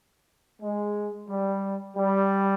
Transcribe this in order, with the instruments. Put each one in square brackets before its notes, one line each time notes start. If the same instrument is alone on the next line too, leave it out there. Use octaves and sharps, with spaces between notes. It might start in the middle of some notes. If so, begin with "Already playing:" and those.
[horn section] G#3
G3
G3